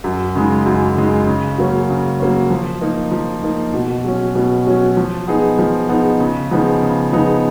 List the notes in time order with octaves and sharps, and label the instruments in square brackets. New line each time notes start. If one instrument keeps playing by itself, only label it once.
[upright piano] F#2
C#3 G#3 D#4
F#2
C#3 G#3 D#4
C#3
F#3 A#3 C#4
C#3
F#3 A#3 C#4
F3
A#3 D#4
F3
A#3 D#4
B2
F#3 C#4
B2
F#3 C#4
F3
B3 D#4 G#4
F3
B3 D#4 G#4
C#3
F3 B3 D#4 G#4
C#3
F3 B3 D#4 G#4